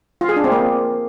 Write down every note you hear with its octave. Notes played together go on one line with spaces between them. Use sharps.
F4
G#4
D4
C4
A#3